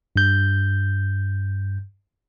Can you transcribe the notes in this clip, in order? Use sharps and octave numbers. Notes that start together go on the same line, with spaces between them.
G2 G6